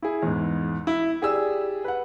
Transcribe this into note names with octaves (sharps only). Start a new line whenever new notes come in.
E4 G#4
E2 G#2
E4
G4 G#4 D5 E6
B4 F#5